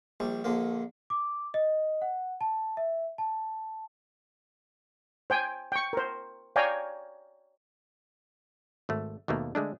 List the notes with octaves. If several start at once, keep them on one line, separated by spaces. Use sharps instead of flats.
A#1 G3
A#1 D3 A#3
D6
D#5
F#5
A5
E5
A5
C5 G5 G#5
G5 C#6
A#4 C5
C#5 D5 F5 G5 G#5 A#5
G#1 A3
D#2 B2 A3 A#3
D3 G#3 A3 D4